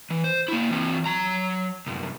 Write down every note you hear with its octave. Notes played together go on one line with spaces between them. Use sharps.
E3
C5
A#3 E4
E3 C4
F#3 A#5
C2 F#2